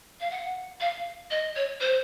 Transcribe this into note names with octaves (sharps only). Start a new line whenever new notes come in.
F5
F#5
F5
D#5
C#5
C5